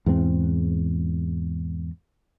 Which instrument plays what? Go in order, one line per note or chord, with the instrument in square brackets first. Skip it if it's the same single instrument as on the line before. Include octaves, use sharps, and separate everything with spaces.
[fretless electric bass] E2 G#2 G#3 C4